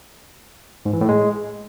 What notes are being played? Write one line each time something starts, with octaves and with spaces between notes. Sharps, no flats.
G#2
E3
A2
G#3